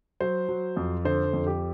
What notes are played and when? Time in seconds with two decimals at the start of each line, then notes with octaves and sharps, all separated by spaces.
0.21 F#3 C5
0.49 F#3
0.77 F2
1.05 D3 C5
1.33 F2
1.47 G4